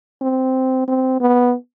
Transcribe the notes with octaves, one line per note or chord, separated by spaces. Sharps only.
C4
C4
B3